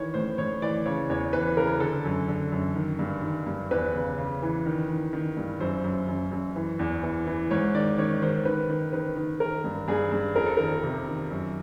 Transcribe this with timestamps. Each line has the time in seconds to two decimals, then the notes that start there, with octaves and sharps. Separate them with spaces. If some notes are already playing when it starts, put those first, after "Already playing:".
Already playing: D#3 E3 C#5
0.14 A2 C5
0.38 A2 C#5
0.62 E3 D5
0.85 C#3 C#5
1.09 E2 C#5
1.33 E3 B4
1.57 C#3 A#4
1.80 D3 A4
2.05 F#2
2.28 D3
2.52 F#2
2.76 D#3
2.99 G2
3.23 D#3
3.47 G2
3.71 E2 B4
3.95 C#3
4.18 C#3
4.42 E3
4.66 D#3
4.89 D#3
5.13 D#3
5.37 G2
5.60 F#2 C5
5.84 F#2
6.08 F#2
6.32 F#2
6.56 E3
6.79 E2
7.03 E3
7.27 E3
7.51 G#2 C#5
7.74 D#3 D5
7.98 D#3 C#5
8.22 D#3 C5
8.45 D#3 B4
8.69 D#3
8.93 D#3 B4
9.17 D#3
9.40 D#3 A#4
9.64 G2
9.88 G2 G#4
10.12 G2
10.36 F2 A#4
10.46 A4
10.57 D#3 A#4
10.83 C3
11.07 D#3
11.31 F#2